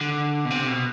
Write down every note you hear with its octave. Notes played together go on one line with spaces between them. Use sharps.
D3
B2
C3
B2